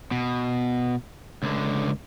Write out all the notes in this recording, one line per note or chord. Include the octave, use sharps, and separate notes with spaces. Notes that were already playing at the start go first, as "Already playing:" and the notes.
B2
C#2 D3